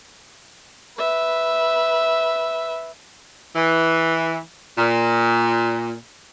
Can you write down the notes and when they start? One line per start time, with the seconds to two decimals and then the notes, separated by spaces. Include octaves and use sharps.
0.98 B4 E5
3.56 E3
4.77 A#2